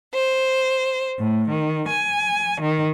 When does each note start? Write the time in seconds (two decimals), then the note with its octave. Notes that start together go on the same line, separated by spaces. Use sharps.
0.13 C5
1.18 A2
1.49 D#3
1.89 G#5
2.61 D#3